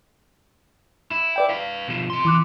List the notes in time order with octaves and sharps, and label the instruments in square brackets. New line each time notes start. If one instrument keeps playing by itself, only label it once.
[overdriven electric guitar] E4
[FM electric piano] B4 D5 G5
[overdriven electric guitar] B4 F5 [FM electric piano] B6
[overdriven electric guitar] B2 F3
C3 C6
[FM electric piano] E3 D6 F#6